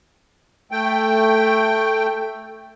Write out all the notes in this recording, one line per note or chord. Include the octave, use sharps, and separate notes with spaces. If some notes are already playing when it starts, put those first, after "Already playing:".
A3 G5